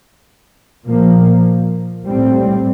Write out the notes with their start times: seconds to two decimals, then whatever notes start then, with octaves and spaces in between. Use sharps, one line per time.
0.86 A#2 F3 A#3
2.05 A2 G3 C4